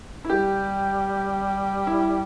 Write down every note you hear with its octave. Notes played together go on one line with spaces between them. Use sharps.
E4
G3 G4
E4